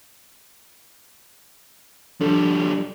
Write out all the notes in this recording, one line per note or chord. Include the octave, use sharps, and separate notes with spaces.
F3 G3 D4 A4